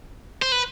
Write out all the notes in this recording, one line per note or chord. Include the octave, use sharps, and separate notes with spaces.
C5
B4